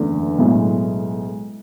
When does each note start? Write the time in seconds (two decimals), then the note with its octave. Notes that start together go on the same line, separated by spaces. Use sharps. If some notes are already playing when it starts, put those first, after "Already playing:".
Already playing: F#1 E2 D3 A3
0.38 B1 A2 G#3